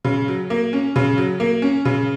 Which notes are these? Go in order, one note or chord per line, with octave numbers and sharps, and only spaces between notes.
C#3
F#3
A#3
C#4
C#3
F#3
A#3
C#4
C#3